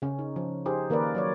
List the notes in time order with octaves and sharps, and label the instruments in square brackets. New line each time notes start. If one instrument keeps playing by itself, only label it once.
[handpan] C#3 C#4
D#4
F3
D#4 G4 G#4 C5
D#3 A#3 A#4 B4 D5
F#3 C#5 D5